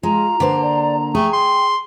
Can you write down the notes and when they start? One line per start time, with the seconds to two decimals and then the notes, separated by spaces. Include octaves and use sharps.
0.03 G#3 F4 A#5
0.40 D3 A#3 B4 C5
0.62 D5
1.15 A3 G#4 G5
1.33 C6